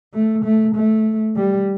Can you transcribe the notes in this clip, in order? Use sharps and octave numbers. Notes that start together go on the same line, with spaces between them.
A3
A3
A3
G3